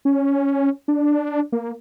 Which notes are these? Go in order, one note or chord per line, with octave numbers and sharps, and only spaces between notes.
C#4
D4
A#3